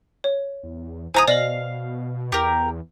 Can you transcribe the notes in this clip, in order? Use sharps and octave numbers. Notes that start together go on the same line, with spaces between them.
C#5
E2
D1 E4 C5 G#5 A#5 D#6
B2 D5 D#5 F5 F#7
E2 G4 A#4